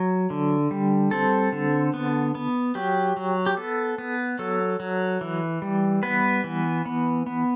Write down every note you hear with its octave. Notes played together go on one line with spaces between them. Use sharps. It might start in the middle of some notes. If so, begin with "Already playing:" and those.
Already playing: F#3
D3
G3
C4 A4
D3
B3
B3
F#3 G4
F#3
G4
B3 A4
B3
F#3 A4
F#3
E3
G3
B3 B4
E3
B3
B3